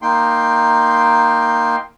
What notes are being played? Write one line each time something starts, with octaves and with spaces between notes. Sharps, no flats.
A#3 D#4 G5 C6